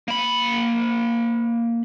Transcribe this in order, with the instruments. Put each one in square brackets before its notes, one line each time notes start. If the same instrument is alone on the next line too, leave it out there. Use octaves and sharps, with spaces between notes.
[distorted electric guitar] A#3 B5